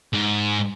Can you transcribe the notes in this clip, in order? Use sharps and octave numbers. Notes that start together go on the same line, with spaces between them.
G#2